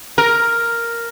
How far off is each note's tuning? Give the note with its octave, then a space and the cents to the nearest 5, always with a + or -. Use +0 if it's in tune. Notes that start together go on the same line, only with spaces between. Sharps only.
A#4 +0